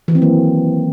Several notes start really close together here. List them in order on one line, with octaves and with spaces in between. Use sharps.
E3 D#3 C4 F#3 A#3